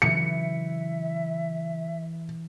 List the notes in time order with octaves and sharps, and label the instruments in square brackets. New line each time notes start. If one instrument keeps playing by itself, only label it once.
[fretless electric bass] C#3 F#3 [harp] E3 [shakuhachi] E5 [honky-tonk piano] C#7